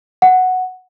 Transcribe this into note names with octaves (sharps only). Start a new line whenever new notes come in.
F#5